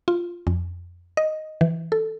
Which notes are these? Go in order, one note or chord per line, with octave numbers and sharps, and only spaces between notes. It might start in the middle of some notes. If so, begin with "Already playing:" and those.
F4
F2
D#5
E3
A4